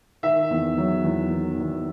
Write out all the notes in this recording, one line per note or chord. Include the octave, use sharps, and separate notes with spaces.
D#3 E5
E2
F#3
E2
D#3
E2